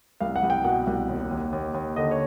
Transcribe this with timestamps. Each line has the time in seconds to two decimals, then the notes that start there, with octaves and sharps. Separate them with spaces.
0.21 C2 F5
0.36 F#5
0.43 C2
0.50 G5
0.64 B2 F#5
0.87 C2
1.09 D#2
1.31 D#2
1.52 D#2
1.74 D#2
1.96 D3 D#5
2.11 C#5